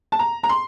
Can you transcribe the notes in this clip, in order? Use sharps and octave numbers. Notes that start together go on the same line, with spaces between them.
A5
A#5
A#5
C6